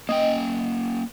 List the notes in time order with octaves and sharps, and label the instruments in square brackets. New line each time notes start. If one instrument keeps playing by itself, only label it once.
[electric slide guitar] A#3 C#4 G5 [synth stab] D#5